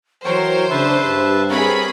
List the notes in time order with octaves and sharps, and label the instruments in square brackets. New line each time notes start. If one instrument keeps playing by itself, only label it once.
[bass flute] E3 [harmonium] F#3 [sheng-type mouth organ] A#4 C#5 G5 [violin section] C5
[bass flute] C#3 [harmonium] D4 [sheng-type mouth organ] B4 E5 A5
[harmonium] G2 [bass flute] G4
[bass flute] C4 [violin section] G#4 B5 [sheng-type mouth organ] A#4 C#5